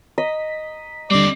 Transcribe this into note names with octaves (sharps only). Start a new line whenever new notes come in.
D#5 A#5 B6
D#2 D3 G3 C4 D5